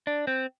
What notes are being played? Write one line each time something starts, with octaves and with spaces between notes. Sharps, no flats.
D4
C4